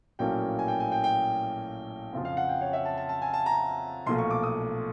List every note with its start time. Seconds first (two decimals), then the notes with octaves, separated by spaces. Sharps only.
0.19 A#1 A2 F#3 A#3 C#4 G5
0.59 G#5
0.68 G5
0.80 G#5
0.92 G5
1.04 G5
2.13 F2 C#3 F3
2.25 F5
2.37 F#5
2.49 G5
2.61 C#5
2.73 E5
2.85 A5
2.97 A5
3.09 A5
3.22 G#5
3.34 A5
3.46 A#5
4.06 B1 A#2 F3 A3 C6
4.18 C#6
4.30 D6
4.43 D#6